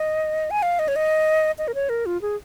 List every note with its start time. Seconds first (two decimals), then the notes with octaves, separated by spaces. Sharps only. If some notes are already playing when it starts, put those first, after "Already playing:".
Already playing: D#5
0.51 G#5
0.63 F5
0.79 D#5
0.88 C#5
0.96 D#5
1.58 D#5
1.68 A#4
1.75 C#5
1.89 A#4
2.06 F4
2.22 G#4